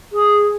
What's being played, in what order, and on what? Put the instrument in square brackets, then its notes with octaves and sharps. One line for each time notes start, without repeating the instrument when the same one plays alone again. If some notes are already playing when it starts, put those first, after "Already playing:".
[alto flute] G#4